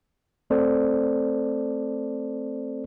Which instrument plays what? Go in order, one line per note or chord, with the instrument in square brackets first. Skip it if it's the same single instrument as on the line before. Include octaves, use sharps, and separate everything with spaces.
[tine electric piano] A3 C4 A4 C5 D5